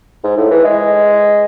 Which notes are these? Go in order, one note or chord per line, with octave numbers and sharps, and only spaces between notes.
G#2
A2
E3
G#3